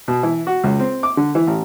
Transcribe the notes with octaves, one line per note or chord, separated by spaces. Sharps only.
B2
E3
F#4
C#2
C4
D6
D3
E3
A1